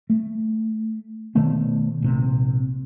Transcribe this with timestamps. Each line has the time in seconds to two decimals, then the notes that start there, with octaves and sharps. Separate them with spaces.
0.10 A3
1.35 B2 D#3 A3 B3
2.02 A#1 C3